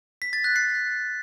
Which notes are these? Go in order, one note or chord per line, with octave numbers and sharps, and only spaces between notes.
B6
A6
F#6
C7